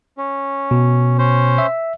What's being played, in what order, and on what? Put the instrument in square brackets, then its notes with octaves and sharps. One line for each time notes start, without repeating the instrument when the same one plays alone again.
[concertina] C#4
[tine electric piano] B2
[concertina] C#4 C5
[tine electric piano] E5